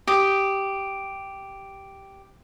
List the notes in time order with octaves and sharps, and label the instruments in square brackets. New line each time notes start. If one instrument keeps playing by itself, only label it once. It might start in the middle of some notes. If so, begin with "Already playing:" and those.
[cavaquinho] G4 D#6